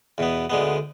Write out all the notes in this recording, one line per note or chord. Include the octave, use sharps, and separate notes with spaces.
E2 B2 B3
D2 D3 G#3 B3